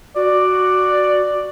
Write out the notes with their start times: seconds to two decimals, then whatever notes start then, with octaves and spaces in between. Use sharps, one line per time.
0.16 F#4 D5